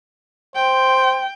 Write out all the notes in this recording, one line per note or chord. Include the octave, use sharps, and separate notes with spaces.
C5 G5